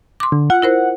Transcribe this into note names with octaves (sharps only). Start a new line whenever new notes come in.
C6 D6
D3
F4 F#5
E4 A#4 C5